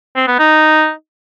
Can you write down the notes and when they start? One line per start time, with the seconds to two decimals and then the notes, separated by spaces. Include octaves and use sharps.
0.16 C4
0.27 B3
0.39 D#4